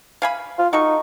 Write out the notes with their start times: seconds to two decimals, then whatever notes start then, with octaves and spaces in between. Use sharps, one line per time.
0.22 F5 G#5 B5
0.58 F4
0.73 D#4 F#4 A4 C#6